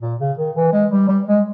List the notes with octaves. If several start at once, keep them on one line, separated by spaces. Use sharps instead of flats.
A#2
C#3
D#3
E3
G#3
G3
G3
G#3